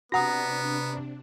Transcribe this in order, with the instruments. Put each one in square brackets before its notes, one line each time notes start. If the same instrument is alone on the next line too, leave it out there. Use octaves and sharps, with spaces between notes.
[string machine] C3 D4 [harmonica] B3 [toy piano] F#4 F#5 D#6 [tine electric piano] A#5 A#6